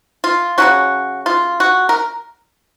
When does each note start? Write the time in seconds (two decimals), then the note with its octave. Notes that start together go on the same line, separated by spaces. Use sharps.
0.24 F4
0.58 C#3 F#3 C#4 F#4
1.26 F4
1.60 F#4
1.89 A#4